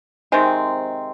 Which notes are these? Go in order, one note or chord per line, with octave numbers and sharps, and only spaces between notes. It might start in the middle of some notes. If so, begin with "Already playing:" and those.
C3 D#3 G#3 C4